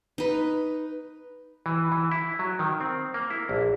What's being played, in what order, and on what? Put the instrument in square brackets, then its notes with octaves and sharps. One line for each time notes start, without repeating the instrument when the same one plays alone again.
[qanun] D#4 B4
[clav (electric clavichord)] E3
E3
E4
F#3
D#3
C4
A#3
E4
A#1